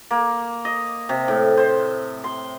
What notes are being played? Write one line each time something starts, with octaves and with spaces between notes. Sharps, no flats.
A#3
D#5
C3
A2
C5
C6